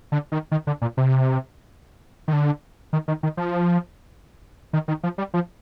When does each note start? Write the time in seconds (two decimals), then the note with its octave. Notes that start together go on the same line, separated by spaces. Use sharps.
0.12 D3
0.32 D#3
0.52 D#3
0.67 D3
0.82 A#2
0.97 C3
2.28 D#3
2.33 D3
2.93 D#3
3.08 D#3
3.23 D#3
3.37 F3
4.73 D#3
4.88 D#3
5.03 F3
5.18 G3
5.34 F3